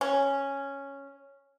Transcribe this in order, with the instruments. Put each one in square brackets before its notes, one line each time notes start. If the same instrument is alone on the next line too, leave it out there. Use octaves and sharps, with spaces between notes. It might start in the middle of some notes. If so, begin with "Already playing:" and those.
[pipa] C#4